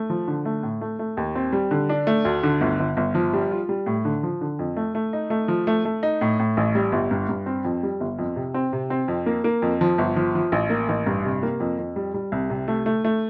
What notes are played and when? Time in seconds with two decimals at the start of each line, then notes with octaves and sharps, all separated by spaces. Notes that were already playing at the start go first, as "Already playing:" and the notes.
Already playing: A3
0.10 F3
0.28 D3
0.45 A3
0.63 A2
0.81 A3
0.99 A3
1.17 D#2
1.35 C4
1.53 G3
1.71 D3
1.89 D4
2.07 A3
2.25 D2
2.43 D3
2.61 G1
2.79 G1
2.97 G1
3.15 F3
3.33 G3
3.51 F4
3.69 G3
3.86 A2
4.05 D3
4.23 F3
4.41 D3
4.59 F2
4.76 A3
4.95 A3
5.13 D#4
5.30 A3
5.48 F3
5.67 A3
5.85 A3
6.03 D#4
6.21 A2
6.39 A2
6.57 A1
6.75 G3
6.92 G1
7.11 G2
7.29 G2
7.46 C4
7.65 F2
7.83 G3
8.00 G1
8.19 F2
8.36 C3
8.54 C4
8.73 C3
8.90 C4
9.08 F2
9.26 A#3
9.44 A#3
9.62 F2
9.81 F3
9.98 G1
10.16 F3
10.35 F3
10.52 A1
10.70 A#3
10.89 A1
11.07 G2
11.24 C3
11.43 A#3
11.60 F2
11.78 F2
11.96 G3
12.14 G3
12.32 C2
12.50 C3
12.68 A3
12.86 A3
13.04 A3